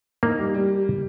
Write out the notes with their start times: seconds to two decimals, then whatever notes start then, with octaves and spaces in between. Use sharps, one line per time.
0.23 A#3 D#4
0.39 G3
0.54 G3